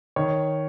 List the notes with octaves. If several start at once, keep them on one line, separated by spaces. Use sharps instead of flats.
D#3 C#5